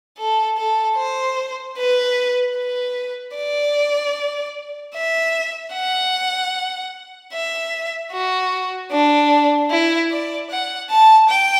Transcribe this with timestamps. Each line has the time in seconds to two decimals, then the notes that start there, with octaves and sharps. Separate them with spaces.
0.18 A4
0.58 A4
0.97 C5
1.77 B4
2.57 B4
3.36 D5
4.95 E5
5.74 F#5
7.33 E5
8.13 F#4
8.91 D4
9.71 E4
10.11 D5
10.50 F#5
10.90 A5
11.30 G5